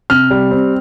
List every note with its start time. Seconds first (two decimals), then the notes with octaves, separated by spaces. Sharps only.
0.10 C3 F6
0.30 G3
0.51 C4